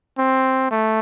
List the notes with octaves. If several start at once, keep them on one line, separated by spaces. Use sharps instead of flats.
C4
A3